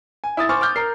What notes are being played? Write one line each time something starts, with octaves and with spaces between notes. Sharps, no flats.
G#5
E4 D#6 A6
C5 G#5 C#6 D6 F6 A6
D6 F6 G6
A#4 C7